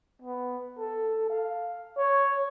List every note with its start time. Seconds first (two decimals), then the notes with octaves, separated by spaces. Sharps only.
0.22 B3
0.78 A4
1.30 F5
1.98 C#5